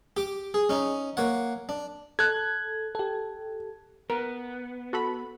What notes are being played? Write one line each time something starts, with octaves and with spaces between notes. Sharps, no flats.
G4 D6
G#4
C#4 D#4
A#3 C#5 F#5
D4
A4 F#6 G#6
G4 A4
B3 A#4
F#4 A4 B5